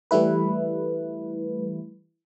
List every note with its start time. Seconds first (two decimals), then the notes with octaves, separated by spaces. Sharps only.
0.11 E3 G3 A3 E4 B4